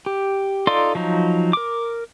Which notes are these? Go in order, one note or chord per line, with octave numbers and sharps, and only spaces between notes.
G4
D#4 F4 A4 D5 C6
F3 F#3 D#4
A#4 D6